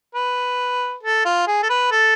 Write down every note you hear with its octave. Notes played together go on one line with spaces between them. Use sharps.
B4
A4
F4
G#4
A4
B4
A4